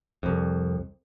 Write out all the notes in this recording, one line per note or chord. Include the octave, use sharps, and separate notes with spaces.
C2 F2